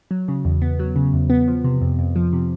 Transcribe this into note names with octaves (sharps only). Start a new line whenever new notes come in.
F#3
C#3
E2
B3
F#3
C#3
E2
B3
F3
C3
F2
F2
F3
C3